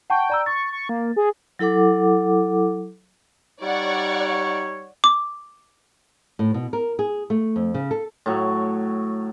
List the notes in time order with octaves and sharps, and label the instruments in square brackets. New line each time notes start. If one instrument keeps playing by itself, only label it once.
[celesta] F#5 A5 C#6 [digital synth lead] G5
[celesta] D5 A#5 E6
[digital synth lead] C#6 [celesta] A6
[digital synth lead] C#6
A#3
G#4
[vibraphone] F#3 E4 A4 F#5 D6
[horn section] G3 D#4 C#5 [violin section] D5 F#5 C#6
[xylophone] D6
[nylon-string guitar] A2
B2
A#4
G#4
A3
F2
C#3
A4
[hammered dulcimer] A2 F#3